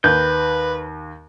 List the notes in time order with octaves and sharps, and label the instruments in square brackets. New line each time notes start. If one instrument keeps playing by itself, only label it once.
[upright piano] D#2 [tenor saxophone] B4 [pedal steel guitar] G6